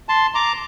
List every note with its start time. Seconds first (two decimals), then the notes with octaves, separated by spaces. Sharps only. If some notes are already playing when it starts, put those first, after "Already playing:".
0.09 A5 C6
0.34 A#5 D6